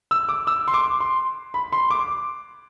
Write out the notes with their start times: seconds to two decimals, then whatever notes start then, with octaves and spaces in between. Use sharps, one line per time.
0.11 E6
0.29 D6
0.47 E6
0.68 C6
0.74 D6
1.00 C6
1.54 B5
1.72 C6
1.90 D6